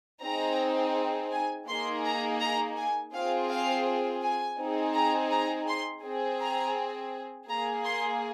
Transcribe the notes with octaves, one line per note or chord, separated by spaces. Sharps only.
C4 D#4 G#4 A#5
G#5
A#3 D#4 G#4 C6
A#5
A#5
G#5
C4 F4 G#4 F5
F5
G#5
C4 D#4 G#4
A#5
A#5
C6
C4 G#4
A#5
A#3 G#4 A#5
C6